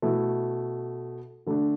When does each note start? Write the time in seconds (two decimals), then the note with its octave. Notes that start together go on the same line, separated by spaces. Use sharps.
0.02 B2 A3 E4
1.46 D3 A3 D4